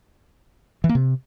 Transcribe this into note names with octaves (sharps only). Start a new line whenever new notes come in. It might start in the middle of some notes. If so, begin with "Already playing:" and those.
E3
A#3
C3